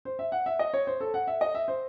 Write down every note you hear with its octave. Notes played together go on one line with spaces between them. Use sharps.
C5
E5
F#5
E5
D#5
C#5
C5
A4
F#5
E5
D#5
E5
C5